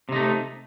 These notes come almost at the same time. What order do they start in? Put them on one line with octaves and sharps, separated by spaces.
C3 D#4 A3